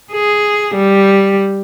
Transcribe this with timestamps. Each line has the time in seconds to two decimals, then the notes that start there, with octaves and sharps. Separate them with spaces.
0.12 G#4
0.75 G3